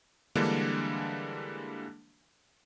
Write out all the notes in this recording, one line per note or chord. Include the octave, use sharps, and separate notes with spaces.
D3 E3 G3 G#3 A#3 D4